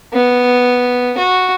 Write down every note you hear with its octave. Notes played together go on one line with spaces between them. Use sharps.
B3
F#4